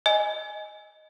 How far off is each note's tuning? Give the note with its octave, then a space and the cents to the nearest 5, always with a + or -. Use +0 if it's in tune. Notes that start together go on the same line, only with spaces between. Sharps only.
D#5 +0 G#5 +0